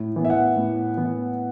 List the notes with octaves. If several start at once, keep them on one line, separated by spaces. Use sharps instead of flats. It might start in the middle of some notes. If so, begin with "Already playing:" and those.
Already playing: A2
E3 B3
E5
F#5
A2
E3 B3